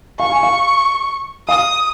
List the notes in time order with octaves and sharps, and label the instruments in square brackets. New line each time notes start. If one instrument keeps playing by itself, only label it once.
[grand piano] F5 [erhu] C#6
[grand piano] G#5
F5
[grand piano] F5 [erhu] D#6